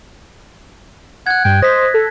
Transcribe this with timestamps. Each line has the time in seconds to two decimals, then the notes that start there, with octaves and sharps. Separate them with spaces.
1.27 F#5 F#6 G#6
1.45 G2 G5
1.62 C5 D#5 A#6 B6
1.94 A4